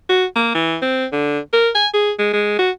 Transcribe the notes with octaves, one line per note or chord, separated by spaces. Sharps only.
F#4
A#3
E3
C4
D3
A#4
G#5
G#4
G#3
G#3
F#4